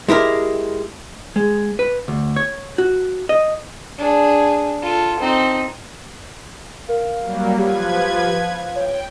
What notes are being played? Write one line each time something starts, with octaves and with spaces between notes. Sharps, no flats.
G#3 E4 G4 A#4
G#3
B4
D2
C#5
F#4
D#5
D4 G#4
F4 A4
C4 D#4
A#4 F5
F#3 G3 A#3
F3 G4 B4 G#6
C#5 G5